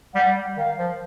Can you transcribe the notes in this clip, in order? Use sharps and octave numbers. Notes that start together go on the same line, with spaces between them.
G3 F#5
G3
D#3 F5
F3